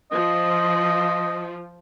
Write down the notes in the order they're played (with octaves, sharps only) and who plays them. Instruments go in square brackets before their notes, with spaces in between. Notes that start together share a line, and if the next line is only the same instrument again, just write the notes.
[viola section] F3 [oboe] D#5